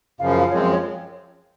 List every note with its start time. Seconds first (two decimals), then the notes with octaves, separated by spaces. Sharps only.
0.19 F#2 C#3 F3 F5
0.29 F5
0.40 F5
0.50 F#2 F3 G#3 C4 C#5
0.60 F5
0.71 C#5